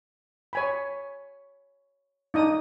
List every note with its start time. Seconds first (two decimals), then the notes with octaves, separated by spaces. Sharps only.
0.53 C#5 G#5 B5
2.34 D4 D#4 D#6